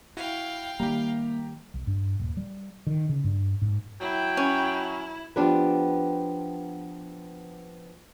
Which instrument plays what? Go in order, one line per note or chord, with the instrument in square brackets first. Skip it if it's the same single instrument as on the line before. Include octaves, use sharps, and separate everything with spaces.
[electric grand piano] E4 F#4 [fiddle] F5 G5
[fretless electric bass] D#3 G3 [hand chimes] A#3 [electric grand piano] G4 A#5
[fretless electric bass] C2
G2
D#1
G3
D#3
C#3
G2
G#2
[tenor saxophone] F#3 [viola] E4 [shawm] G5
[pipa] C#4
[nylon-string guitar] F3 B3 D4 G4 B4